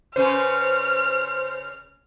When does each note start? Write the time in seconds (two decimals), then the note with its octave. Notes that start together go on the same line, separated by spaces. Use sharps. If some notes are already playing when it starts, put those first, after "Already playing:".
0.16 C#3 C#4 B4 C5 F6